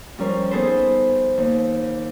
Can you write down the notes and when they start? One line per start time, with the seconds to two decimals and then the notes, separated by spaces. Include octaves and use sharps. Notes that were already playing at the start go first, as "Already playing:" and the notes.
0.18 F3 G3 C#4 A#4 C5
0.51 B3 D#4 G#4 A4 B4 C5
1.37 D#2